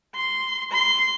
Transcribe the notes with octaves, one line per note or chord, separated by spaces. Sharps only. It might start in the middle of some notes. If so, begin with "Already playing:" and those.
C6
C6